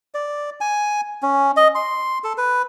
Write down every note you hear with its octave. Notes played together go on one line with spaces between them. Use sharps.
D5
G#5
C#4
D#5
C6
A4
B4